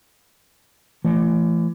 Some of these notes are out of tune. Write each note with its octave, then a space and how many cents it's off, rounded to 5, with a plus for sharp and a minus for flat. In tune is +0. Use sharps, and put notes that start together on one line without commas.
E3 +35 A3 +15